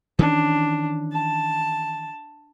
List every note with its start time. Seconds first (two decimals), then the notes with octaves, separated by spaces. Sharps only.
0.19 D#3 E3 C#4 D4
1.12 A5